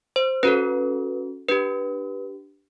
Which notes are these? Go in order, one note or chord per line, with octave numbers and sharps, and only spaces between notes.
C5
C#4 F#4 A4 B4
D4 G4 B4